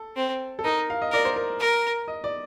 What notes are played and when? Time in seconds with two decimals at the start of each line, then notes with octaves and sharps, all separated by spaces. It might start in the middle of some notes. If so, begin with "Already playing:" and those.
Already playing: A4
0.16 C4
0.59 A4
0.64 D#4 A#4
0.90 F5
1.02 D#5
1.12 A#4 D5
1.25 C5
1.36 A#4
1.60 A#4
2.08 D#5
2.24 D5